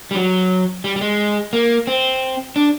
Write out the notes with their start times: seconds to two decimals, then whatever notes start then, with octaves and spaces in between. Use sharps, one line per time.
0.11 G3
0.15 F#3
0.84 G3
0.96 G3
1.01 G#3
1.53 A#3
1.87 C4
2.56 D4